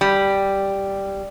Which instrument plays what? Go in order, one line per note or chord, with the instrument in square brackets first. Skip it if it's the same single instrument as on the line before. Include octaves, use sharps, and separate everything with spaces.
[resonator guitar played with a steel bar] G3